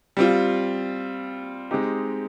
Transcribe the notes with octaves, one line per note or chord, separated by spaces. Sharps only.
G3 C4 F4
G#3 C4 D#4 G4